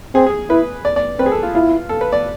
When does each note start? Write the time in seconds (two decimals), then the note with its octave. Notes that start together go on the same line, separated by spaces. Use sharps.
0.15 C4 G#4
0.26 G#4
0.50 E4 B4
0.85 D5
0.96 D5
1.19 C4 B4
1.26 G#4
1.32 A4
1.43 F4
1.55 E4 F4
1.89 A4
2.01 B4
2.12 D5